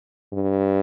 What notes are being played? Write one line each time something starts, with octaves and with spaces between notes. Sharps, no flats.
G2